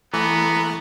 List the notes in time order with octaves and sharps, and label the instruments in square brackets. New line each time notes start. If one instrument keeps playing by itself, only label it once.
[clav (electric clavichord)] E3 [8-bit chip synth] A3 [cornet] B3 [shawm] A#5